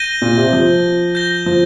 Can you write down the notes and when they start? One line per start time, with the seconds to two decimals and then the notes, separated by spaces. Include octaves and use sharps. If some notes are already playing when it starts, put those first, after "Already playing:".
Already playing: G6 A#6 D#7 G7
0.22 A#2
0.37 C3
0.53 F3
1.15 G6 A#6 G7
1.46 F3